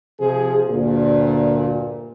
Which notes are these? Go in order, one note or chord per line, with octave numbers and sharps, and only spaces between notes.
C3 F3 G#4
D2 G2 A#2